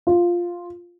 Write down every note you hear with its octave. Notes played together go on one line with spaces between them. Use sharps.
F4